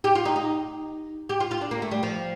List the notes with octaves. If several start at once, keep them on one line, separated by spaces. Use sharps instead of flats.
G4
F4
D#4
D#4
G4
F4
F4
D4
A#3
A3
G3
F3